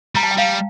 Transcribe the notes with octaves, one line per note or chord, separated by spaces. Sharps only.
G3 A#5
A5
G5
G3 F5